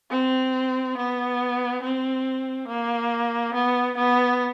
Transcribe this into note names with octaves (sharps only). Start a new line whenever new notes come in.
C4
B3
C4
A#3
B3
B3